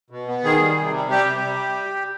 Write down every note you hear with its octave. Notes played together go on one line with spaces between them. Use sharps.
B2
B3
D#3 G#4
G3
C3
G3
G3 G4
C3
G3